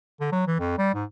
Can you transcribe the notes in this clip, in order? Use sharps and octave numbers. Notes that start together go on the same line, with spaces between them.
D3
F#3
E3
F2
G3
G#2